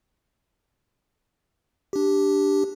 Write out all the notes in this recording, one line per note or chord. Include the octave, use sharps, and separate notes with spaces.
D4 G4